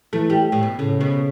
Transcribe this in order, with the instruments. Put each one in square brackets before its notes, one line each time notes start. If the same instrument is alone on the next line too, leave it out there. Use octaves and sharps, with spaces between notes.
[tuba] E3 [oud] A3
[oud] G3
A2
B2
[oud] A2 [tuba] C#3
[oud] B2